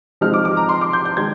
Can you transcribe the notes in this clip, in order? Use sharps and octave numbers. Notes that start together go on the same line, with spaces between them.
C3 F3 G#3 D#4 F6
D6
D6
A#5
C6
D6
G6
G6
D#3 G#3 G#6